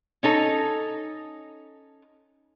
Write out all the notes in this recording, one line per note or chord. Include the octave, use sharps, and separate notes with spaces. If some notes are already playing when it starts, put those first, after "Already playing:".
C#4 D#4 A4